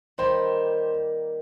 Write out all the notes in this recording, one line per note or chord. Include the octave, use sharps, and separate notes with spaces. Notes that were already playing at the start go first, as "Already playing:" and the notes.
D#3 G3 A#3 C5